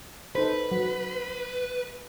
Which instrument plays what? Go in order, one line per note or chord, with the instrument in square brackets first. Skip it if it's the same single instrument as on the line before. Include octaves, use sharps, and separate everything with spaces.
[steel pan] D#4 A4 C5 [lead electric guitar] B4
[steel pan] F#3